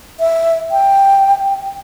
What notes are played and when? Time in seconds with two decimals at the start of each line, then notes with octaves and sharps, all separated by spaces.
0.20 E5
0.71 G5